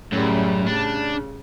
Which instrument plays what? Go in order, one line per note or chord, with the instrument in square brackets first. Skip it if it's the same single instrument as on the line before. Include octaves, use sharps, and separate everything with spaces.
[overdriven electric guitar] F#2 [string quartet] A2 C#3 G3
[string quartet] C#3 [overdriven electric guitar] D4